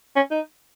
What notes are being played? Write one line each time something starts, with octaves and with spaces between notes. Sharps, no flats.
C#4
D#4